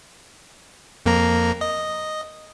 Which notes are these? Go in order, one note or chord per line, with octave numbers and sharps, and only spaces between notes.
F2 A#3 A#5
D#5